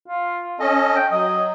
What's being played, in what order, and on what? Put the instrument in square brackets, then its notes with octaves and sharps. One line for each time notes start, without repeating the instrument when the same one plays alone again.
[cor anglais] F4
[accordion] C#4 D#5 [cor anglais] A4
[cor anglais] G5
[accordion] F#3 [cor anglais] D#5